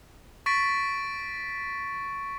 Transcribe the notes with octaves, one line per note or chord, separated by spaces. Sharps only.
C#6 A6 B6 D7